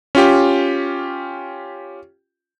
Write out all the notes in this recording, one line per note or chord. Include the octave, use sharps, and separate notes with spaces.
C#4 F4 G4